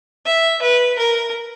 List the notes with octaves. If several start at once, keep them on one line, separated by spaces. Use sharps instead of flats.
E5
B4
A#4